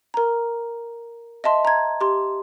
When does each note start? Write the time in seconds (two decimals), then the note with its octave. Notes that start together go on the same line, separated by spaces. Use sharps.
0.14 A#4 A#5
1.44 D#5 E5 A5 C6
1.65 A#5 G#6
2.01 G4 C6